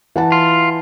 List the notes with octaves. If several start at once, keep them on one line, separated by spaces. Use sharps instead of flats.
E3 F#5 A5
F4